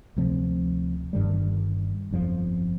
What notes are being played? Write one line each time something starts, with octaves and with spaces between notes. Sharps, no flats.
D2 C3 F3 C4
G1 G2 D#3 G3
G1 F2 D3 F3